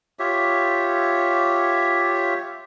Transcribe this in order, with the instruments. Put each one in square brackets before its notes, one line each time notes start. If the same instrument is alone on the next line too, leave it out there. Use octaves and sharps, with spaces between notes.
[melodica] F4 G4 C#5 E5